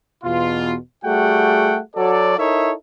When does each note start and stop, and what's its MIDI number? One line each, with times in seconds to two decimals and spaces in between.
0.24 0.76 40
0.24 0.76 47
0.24 0.76 65
1.05 1.79 55
1.05 1.79 57
1.05 1.79 66
1.05 1.79 68
1.05 1.79 78
1.05 1.79 79
1.96 2.34 54
1.96 2.34 66
1.96 2.34 69
1.96 2.34 73
1.96 2.34 74
2.38 2.73 63
2.38 2.73 64
2.38 2.73 69
2.38 2.73 70
2.38 2.73 73
2.38 2.73 76